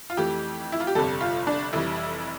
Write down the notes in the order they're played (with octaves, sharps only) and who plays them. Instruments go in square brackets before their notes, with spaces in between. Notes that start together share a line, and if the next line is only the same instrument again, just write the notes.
[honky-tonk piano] F4
F2 E3 A3 G4
E4
F4
G4
G1 F2 C3 G3 A4
F4
D4
F1 F2 E3 G3 E4